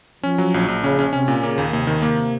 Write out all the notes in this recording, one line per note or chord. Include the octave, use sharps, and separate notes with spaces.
F3 C#4
F#3
A#1
A#1
C#3 C#4
C#4
C3 C#4
A#2
C#3 A#3
D#2
D#2 C3
D#3
C3 A#3